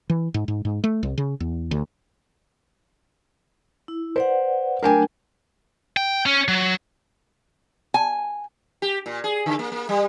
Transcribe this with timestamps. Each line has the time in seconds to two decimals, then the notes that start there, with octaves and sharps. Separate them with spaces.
0.10 E3
0.34 G#2
0.48 G#2
0.65 G#2
0.84 A3
1.03 C2
1.18 C#3
1.40 E2
1.71 D2
3.88 E4
4.16 B4 C5 D5 F#5
4.83 F#3 A3 D4 A#4 G5 G#5
5.97 G5
6.26 C#4
6.48 F#3
7.94 G#5
8.82 G4
9.06 A#2
9.24 G#4
9.46 D3
9.59 A#3
9.72 A#3
9.89 G3